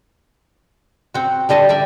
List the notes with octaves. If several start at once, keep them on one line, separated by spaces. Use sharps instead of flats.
C4 F#4
D3 G3 D#5 A5
G3 D5 E5